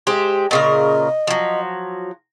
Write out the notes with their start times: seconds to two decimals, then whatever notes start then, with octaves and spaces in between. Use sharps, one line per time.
0.07 G#3 G4 C5
0.51 A#2 C#3 A#4 D#5
1.27 F3 F#3